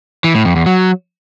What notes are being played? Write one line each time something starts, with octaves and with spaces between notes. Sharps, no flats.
E3
A2
F2
E2
F#3